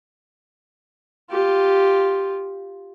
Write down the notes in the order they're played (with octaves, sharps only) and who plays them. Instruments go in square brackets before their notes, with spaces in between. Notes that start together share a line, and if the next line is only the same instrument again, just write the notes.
[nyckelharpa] F4 G4